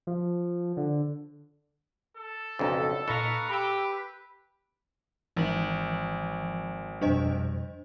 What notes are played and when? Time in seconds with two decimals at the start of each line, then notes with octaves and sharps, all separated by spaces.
0.07 F3
0.77 D3
2.16 A4
2.59 B1 F2 C#3 D4 D#4
3.08 A#2 D#4 A4 B4 F5 A#5 C#6
3.49 G4 B5 E6
5.37 G#1 E3 F3 F#7
7.01 F2 B2 G3 D4 C5 D#5